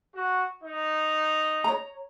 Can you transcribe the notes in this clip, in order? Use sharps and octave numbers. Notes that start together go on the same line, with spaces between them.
F#4
D#4
C#5 A#5